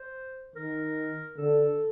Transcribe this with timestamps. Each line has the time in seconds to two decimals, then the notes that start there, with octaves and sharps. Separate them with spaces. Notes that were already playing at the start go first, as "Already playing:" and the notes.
Already playing: C5
0.56 D#3 A#4
1.37 D3 A4